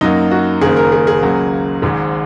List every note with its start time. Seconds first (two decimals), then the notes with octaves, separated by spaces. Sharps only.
0.01 F#2 F#3 A#3 D#4
0.31 F#4
0.62 F#1 F#2 D#3 A#3 G#4
0.76 A#4
0.92 G#4
1.07 G#4
1.22 C#2 C#3 F#3 A#3
1.82 G#1 G#2 G#3